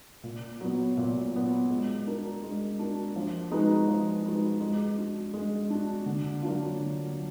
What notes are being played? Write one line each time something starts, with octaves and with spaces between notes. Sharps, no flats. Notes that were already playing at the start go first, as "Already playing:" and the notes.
A#2
F#3 B3
A#2
F#3 B3
G#3
D4 F#4 A#4
G#3
D4 F#4 A#4
F3
G#3 D#4 F#4 B4
F3
G#3 D#4 F#4 B4
G#3
D4 F#4
G#3
D4 F#4
D3
F#3 A#3 D4 F4
D3
F#3